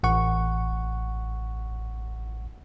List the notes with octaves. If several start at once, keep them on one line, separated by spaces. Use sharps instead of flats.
A1 F#5 C#6